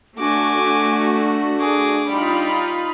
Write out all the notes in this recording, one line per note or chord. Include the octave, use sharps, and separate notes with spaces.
A3 D4 F#4 G#5 D6
D4
G#4 D6
G3 D#4 F4 B5